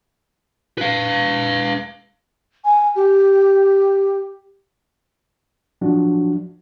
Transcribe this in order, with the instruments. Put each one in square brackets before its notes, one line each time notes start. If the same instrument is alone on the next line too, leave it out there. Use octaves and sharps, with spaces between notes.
[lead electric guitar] B4 F5
[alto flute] G#5
G4
[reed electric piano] F3 F#3 D4 F#4